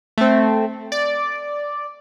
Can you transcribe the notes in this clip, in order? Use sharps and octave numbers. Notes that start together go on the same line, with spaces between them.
A3 C4
D5